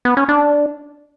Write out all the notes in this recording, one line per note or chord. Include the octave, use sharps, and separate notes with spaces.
B3
C#4
D4